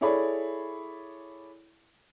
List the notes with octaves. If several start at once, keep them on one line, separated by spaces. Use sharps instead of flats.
E4 G#4 A4 C#5 D5 B5